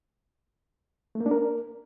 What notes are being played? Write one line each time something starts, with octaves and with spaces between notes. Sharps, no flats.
A3
A#3
D4
A#4